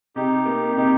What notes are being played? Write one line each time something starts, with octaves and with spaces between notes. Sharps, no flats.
C3 D#4 G4
A#3
C3 D#4 G4